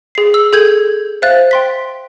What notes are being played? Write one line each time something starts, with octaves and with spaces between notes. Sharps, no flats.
G#4 C7
E6
G#4 A4 G6 G#6 F#7
C5 E5 F5 F#6 A6
G5 C6 B6